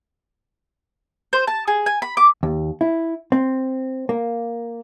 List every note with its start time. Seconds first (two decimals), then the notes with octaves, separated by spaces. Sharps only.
1.33 C5
1.47 A5
1.68 G#4
1.86 G#5
2.02 B5
2.17 D6
2.43 D#2
2.81 E4
3.32 C4
4.09 A#3